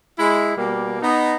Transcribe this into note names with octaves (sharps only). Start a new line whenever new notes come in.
G#3 E4
B2 G3 A#3
B3 D#4